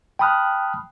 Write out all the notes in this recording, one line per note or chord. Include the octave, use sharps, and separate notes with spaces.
G5 A5 B5 D#6 F6 F#6